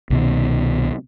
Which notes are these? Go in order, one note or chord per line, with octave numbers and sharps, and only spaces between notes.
C2 B2 D#3